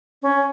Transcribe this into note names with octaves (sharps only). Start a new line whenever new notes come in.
C#4